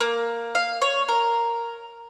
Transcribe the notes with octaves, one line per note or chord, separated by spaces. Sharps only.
A#3
F5
C#5
A#4